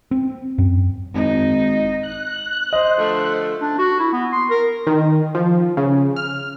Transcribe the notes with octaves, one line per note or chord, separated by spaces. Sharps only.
C4
F#2
G#1 D#4
F#6
C5 D#5
D3 F3 A3
D4
F#4
E4
B3
C6
A#4
D#3
F3
C#3
F6